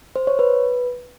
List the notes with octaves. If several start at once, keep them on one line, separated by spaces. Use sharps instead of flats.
C5
C#5
B4